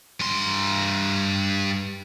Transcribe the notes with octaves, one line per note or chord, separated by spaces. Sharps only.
G2 C6